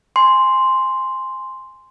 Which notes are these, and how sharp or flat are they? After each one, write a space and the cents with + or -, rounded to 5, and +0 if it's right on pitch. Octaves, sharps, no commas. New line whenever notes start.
G#5 +0 C6 +0